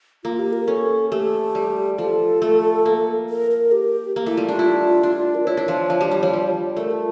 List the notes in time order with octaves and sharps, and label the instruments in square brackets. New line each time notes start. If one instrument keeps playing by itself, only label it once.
[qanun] A#3 [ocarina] F4
[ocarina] G4
A#4
[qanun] C#4 [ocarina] A4
[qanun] A3 [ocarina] G4
[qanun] G3
[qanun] F3 [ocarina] A4
[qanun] A3
A#3
[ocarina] A#4
A#4
G4
[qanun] A#3
[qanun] A3 [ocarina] E4
[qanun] G3 [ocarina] F4
[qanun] D4 [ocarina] F4
[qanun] E4
D4
[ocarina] A#4
[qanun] E4 [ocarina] C#5
[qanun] D4
F3
F3
G3
G3
F3
G3
[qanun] A3 [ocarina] A#4
[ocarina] F4